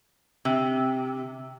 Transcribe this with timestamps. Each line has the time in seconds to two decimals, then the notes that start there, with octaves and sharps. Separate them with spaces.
0.45 C3